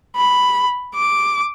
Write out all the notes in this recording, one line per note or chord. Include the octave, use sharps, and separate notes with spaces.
B5
D6